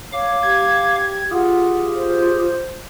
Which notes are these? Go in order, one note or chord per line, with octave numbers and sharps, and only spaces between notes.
C#5 F5 D6
G4 G#6
F4 G4 G#4 F#5
C5